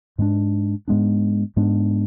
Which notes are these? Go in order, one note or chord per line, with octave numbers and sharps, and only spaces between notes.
G#2 G#3 B3 D4
G#2 G#3 B3 D4
G#2 G#3 B3 D4